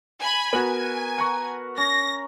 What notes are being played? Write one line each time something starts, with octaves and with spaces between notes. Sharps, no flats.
G#5 B5
B3 F#4 A#4 G#5
F#5 A#5 C#6
C#4 A#6